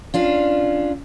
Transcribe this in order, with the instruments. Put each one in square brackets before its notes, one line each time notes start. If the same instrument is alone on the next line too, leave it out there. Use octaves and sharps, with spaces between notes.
[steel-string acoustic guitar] C#4 D4 F4